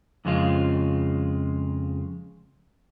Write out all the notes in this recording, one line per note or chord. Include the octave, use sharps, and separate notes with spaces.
F2 C#3 G#3 F4